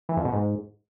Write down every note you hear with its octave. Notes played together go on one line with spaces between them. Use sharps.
E3
F2
B2
G#2